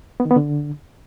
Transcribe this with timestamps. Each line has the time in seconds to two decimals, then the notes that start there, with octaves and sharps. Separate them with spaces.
0.20 B3
0.25 D#3
0.31 B3
0.36 D3